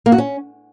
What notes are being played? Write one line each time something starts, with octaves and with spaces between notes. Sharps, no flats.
A#3
F#4
C#4